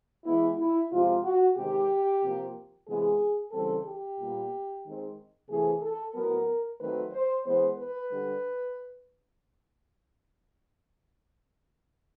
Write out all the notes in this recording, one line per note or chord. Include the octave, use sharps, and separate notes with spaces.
E3 G#3 B3 E4
E4
C3 F3 G#3 C4 F4
F#4
C3 D#3 G#3 C4 G4
C3 F3 A#3
C3 E3 G#3 B3 G#4
C#3 E3 G3 C4 A4
G4
A#2 G3 B3
D#3 G#3 C4
C3 E3 A3 C4 G#4
A4
A2 F#3 B3 A#4
D#3 F#3 A3 C4 B4
C5
E3 G#3 B3 C5
B4
D3 G3